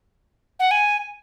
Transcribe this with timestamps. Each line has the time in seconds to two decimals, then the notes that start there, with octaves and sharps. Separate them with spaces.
0.60 F#5
0.71 G#5